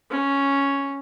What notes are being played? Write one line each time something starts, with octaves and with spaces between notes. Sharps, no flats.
C#4